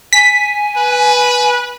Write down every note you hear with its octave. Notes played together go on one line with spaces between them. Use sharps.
G#5 B6
B4